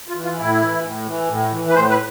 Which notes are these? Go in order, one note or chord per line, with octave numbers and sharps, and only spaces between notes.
F4
E3
F4
A2 E4
E3
A2
E3
A2
E3
B4
A2 C5
B4